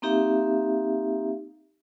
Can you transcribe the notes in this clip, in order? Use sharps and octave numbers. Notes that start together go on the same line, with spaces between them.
A#3 C4 D#4 G4 E5 F5